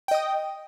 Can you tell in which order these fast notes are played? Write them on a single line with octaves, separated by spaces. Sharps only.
G5 D#5 D#6